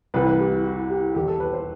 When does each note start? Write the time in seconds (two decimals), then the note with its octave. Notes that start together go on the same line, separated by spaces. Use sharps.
0.14 C2 C3 E3 G3 B4
0.27 B4
0.39 G4
0.52 F#4
0.64 F#4
0.90 G4
1.15 E1 D#2 D#3 G4
1.28 A4
1.40 B4
1.53 C5